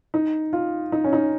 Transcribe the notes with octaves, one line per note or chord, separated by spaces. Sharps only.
D#4
F4
D#4
C#4
D#4